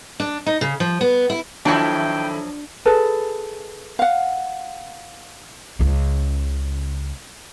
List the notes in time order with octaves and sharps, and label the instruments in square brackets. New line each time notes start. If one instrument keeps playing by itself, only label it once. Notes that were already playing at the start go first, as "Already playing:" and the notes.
[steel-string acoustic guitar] D4
D#4
C#3
F3
B3
E4
[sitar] D#3 A3 E4 [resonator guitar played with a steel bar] F3 F#3 [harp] D4 [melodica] G5
[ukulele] G#4 A4 B4
F5 F#5
[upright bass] C#2 C#3